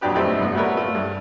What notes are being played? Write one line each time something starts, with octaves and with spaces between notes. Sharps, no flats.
A#1 F2 F#3 D4 G4 B4
G3 A3 C4 D#4 E4
C2 A2 B3
G3 A3 F#4 A#4 B4 C#5
A3 F4
G2